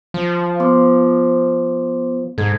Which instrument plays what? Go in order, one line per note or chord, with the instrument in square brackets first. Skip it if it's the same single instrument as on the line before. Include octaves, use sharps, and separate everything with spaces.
[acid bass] F3
[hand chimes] B3 C6 D6
[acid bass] G#2 [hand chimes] A4 G#6